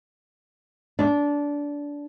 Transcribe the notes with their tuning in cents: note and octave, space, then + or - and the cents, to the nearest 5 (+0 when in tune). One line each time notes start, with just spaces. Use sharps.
D4 -20